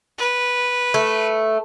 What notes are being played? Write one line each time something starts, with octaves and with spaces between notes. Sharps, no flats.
B4
A3